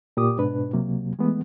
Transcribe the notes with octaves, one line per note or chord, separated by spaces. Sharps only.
A#2 G4 D6 D#6
G#2 B2 D4 B4
C#2 C3 F#3 A#3
E3 G#3 A3 B3